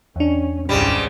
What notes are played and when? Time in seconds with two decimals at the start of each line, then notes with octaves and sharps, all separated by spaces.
0.16 E2 C#4 D4
0.69 G#1 C#2 G#2 C#3 G3